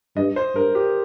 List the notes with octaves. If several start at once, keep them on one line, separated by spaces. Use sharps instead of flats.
G2 D#5
C5
G2 A#4
G4